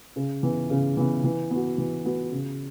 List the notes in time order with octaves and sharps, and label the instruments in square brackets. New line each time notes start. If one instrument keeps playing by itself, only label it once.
[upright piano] C#3
E3 B3
C#3
E3 B3
E3
B3 F#4
E3
B3 F#4
C#3